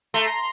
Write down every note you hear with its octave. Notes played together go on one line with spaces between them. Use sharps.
A3 A#5 C6